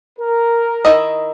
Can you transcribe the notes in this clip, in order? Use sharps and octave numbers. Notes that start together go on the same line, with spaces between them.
A#4
D#3 E4 D#5